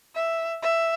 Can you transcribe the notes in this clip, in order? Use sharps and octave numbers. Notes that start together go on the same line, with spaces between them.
E5
E5